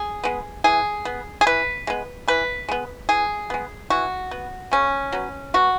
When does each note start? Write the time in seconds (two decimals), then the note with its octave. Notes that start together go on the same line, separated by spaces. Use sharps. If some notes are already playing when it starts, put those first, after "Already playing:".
Already playing: G#4
0.24 G#3 B3
0.64 E3 G#4
1.05 B3
1.41 G#4
1.47 E3 B4
1.87 G#3 B3
2.28 E3 B4
2.69 G#3 B3
3.09 E3 G#4
3.50 G#3 B3
3.90 E3 F#4
4.31 B3
4.72 C#3 C#4
5.12 F#3 B3
5.54 B2 F#4